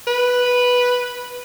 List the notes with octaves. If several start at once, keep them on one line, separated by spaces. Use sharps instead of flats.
B4